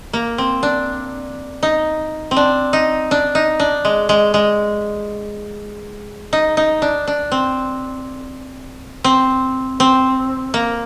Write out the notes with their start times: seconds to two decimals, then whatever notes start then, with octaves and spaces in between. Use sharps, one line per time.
0.13 A#3
0.38 C4
0.63 D4
1.63 D#4
2.31 C4
2.36 D4
2.73 D#4
3.11 D4
3.35 D#4
3.60 D4
3.85 G#3
4.09 G#3
4.34 G#3
6.33 D#4
6.57 D#4
6.82 D4
7.07 D4
7.32 C4
9.04 C4
9.80 C4
10.54 A#3